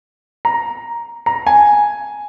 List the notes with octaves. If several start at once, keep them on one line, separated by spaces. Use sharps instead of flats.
A#5
A#5
G#5